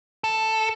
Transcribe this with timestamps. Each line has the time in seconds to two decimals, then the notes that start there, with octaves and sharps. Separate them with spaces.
0.24 A4